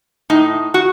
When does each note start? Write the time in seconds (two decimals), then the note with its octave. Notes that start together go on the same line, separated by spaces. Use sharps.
0.30 A2 D#4
0.74 F#4